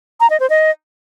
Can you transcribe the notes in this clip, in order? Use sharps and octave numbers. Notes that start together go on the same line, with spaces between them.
A#5
D#5
C5
D#5